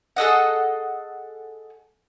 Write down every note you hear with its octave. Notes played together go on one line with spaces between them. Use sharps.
G#4 A4 D#5 F#5